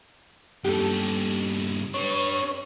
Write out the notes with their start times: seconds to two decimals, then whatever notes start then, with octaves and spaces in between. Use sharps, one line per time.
0.64 G2 C#3 G4 A4
1.94 D4 B4 C#5